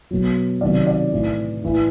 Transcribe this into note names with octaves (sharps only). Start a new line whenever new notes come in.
B2 F#3
C3 D#3 F#3 D5
D5
A2 E3
A2 E3